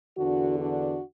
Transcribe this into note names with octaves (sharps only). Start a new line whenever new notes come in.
E2 D3 D4 F#4
D4 F#4